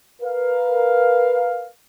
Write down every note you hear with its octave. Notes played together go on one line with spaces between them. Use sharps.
A#4 B4 F5